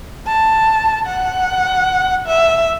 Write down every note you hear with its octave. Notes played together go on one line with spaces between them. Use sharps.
A5
F#5
E5